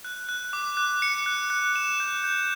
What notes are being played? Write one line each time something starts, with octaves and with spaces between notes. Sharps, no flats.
F#6
F#6
D6
F#6
C#7
F#6
F#6
E7
G6
G6